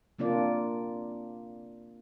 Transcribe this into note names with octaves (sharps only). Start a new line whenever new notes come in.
C3 A#3 D4 F4 D5